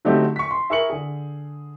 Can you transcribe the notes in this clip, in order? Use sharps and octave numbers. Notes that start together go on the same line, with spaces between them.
D3 F#3 A3 C4 D#4 G4
C#6 B6
C6
E4 G#4 A#4 C#6 C#7 F#7
D3 G#4